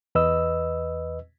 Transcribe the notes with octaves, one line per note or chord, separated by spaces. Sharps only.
E2 B4 D#5 E6